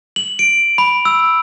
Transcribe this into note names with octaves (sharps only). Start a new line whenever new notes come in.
F#7
D7
B5
E6